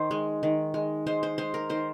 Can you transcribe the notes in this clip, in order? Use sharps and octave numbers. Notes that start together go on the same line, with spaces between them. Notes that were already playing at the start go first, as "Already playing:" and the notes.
Already playing: D#3 C5
G#3
D#3
G#3
G#3 C5
C5
G#3 C5
A#4
D#3 C5